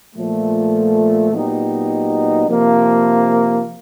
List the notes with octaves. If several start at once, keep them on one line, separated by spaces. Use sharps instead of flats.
A#2 F3 A3
A#2 F#3 B3 D#4 G4
C3 F3 A#3